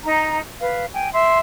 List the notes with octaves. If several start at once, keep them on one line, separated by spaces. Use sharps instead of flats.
D#4 A#5
B4 F5
G5 G#5
E5 C6